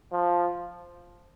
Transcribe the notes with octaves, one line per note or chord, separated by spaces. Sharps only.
F3